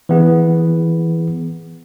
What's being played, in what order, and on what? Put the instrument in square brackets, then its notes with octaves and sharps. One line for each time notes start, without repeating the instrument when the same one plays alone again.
[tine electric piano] E3 B3 G#4